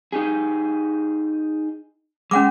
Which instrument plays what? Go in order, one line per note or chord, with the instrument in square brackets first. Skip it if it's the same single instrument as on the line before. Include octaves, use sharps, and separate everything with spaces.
[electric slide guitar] D#4 G4 G#4
[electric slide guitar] G#3 [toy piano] C#4 F#5 D6